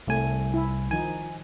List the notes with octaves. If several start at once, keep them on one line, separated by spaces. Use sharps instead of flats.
C2 G3 A3 G#5
E4
D#3 F3 D#4 G#5